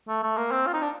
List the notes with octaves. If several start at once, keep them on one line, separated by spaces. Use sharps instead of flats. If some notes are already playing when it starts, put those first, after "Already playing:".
A3
A3
A#3
C4
F4
D#4
D4